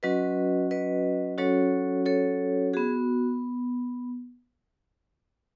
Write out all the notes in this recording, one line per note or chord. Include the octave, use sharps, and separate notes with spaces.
F#3 C#4 F#4 B4 D#5
B4 D#5
F#3 C#4 F#4 A4 C#5
A4 C#5
B3 F#4 G#4